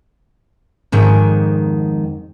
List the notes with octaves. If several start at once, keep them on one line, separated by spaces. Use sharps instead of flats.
F2 G#2 D#3